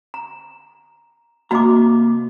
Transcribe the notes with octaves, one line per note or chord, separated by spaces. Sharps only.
A#5
C3 A#3 F#4 D#5 A#5 D6